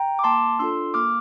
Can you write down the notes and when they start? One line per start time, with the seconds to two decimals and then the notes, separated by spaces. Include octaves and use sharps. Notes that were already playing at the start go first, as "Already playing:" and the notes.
Already playing: G5 A#5
0.19 D6
0.24 A#3 A5 C6
0.59 D4 F4 A4 C6 E6
0.94 A#3 D6 F6